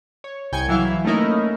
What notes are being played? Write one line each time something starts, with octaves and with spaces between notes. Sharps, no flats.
C#5
C2 G5 G#5 G#6 C#7
E3 F#3 E4 E5 F5
A3 A#3 C#4 D#4 E4 A#4